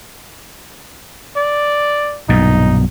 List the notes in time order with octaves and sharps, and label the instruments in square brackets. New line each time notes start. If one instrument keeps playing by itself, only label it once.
[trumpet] D5
[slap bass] B1 G2 A#2 [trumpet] D#4